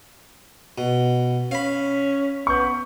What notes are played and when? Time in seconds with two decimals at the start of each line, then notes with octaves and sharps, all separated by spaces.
0.78 B2
1.51 C#4 F5 B5
2.47 B3 C#6 G6